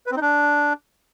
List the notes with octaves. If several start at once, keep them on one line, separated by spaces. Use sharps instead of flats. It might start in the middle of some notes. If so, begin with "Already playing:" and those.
B4
C4
D#4
D4